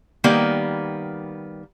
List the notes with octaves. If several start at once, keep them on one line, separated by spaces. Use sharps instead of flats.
D#3 G3 A#3 B3